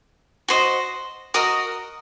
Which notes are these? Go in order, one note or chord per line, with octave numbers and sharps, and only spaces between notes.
F#4 C5 D#5
F#4 A#4 D#5 D#6